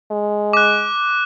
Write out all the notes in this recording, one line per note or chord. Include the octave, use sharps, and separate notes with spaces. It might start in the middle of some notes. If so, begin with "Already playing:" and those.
G#3
D6 F#6